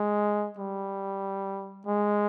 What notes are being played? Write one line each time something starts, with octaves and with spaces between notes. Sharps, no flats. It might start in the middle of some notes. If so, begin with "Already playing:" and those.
Already playing: G#3
G3
G#3